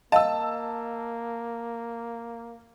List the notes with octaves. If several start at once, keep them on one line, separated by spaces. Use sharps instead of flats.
A#3 D#5 F5 A5 E6